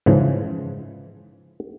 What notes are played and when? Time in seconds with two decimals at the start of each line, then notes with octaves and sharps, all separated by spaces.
0.06 G#2 C#3 E3 F3